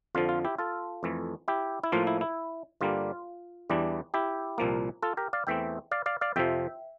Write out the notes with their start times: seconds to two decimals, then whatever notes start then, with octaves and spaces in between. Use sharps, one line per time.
0.15 F2 D3 F3 F4
0.29 F4
0.45 E4 G4
0.59 F4 A4
1.03 F2 E3 A3
1.48 E4 G4
1.84 E4
1.92 A2 F3 A#3 F4
2.07 E4
2.21 E4
2.81 G2 D3 G3 A#3 D4 F4
3.70 E2 E3 G3 D4
4.14 E4 G4
4.58 C2 A#2 F3 A#3
5.02 F4 A4
5.17 G4 A#4
5.33 D5 F5
5.47 E2 E3 A3 C4 E5 G5
5.91 D5 F5
6.06 D5 F5
6.21 D5 F5
6.36 F2 C3 F3 E5 G5